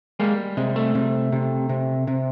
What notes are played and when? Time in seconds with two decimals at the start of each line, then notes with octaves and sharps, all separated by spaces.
0.20 G3 G#3 A#3
0.57 C3 G#3
0.76 A3
0.95 C3
1.32 C3
1.69 C3
2.07 C3